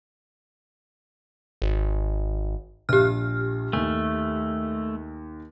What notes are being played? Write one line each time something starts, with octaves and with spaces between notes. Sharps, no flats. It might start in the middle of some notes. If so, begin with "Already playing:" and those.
G#1
A#1 G4 F6
D#2 A3 G#5